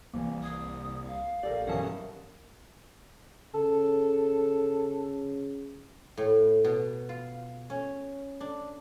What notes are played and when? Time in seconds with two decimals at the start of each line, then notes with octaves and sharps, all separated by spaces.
0.14 C2 E3 A#3
0.43 D#6 G#6 C7
1.08 F5
1.43 A#1 G4 A4 A#4 D5
1.67 B1 G2 E3 C#4 F#5 A5 D#6
3.55 C#3 A4
6.17 A2
6.65 B2
7.09 F4
7.70 C#4
8.40 D4